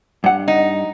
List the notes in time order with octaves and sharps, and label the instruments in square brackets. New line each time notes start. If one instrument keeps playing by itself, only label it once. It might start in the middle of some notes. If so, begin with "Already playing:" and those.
[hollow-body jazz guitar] G2 F#5
[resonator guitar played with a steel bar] D#4